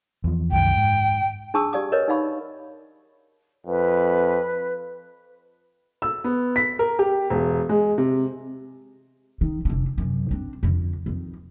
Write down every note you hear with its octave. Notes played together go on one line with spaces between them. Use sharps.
E2 F3
C2 F#2 D#3 G5
G#2
D4 G#4 A5 C#6 D#6 E6
G4 D5 F5 D#6
A#4 B4 C#5 D#5
D#4 D5 F5 B5 C#6
F2 B4
E6
B3
B6
A#4
G4
E1
G#3
C3
D#3
F1 D3
F#2 C3
C4 D4
F2 D3
F2 D#3